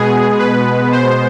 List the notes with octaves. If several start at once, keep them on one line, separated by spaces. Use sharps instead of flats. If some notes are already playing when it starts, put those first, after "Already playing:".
Already playing: B2 G#3 B3 G#4
B4
C5